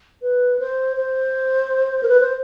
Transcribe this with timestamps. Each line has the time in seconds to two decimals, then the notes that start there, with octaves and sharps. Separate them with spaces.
0.22 B4
0.60 C5
0.97 C5
2.03 A#4
2.08 B4
2.20 C5